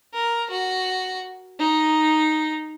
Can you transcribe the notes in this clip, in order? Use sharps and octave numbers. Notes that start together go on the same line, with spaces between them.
A#4
F#4
D#4